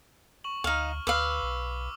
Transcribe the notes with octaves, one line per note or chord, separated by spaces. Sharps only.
C#6 E7 F#7
D2 D#4 F5 F6
D2 B4 F5 D6 E6 F#7
B1